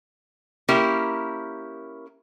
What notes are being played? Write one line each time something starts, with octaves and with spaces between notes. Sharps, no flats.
A#3 C#4 E4 G4 A#4